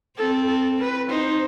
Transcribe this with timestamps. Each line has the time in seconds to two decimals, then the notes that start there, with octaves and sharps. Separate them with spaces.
0.18 C4 A4
0.49 A4
0.80 B4
1.10 D#4 C5